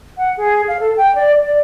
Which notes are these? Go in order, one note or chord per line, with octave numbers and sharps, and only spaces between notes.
F#5
G#4
F5
A4
G5
D5
D5